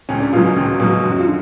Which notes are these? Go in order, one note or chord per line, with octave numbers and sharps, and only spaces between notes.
C#2 C#4
D4
B2 F#3 F4
C#4
C#2
B2 F#3
F#2
F#4
F4
D3